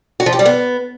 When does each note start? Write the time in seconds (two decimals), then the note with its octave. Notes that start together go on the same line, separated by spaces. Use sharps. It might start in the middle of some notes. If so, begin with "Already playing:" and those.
0.20 F#4
0.26 F3
0.33 G4
0.39 G3
0.45 B3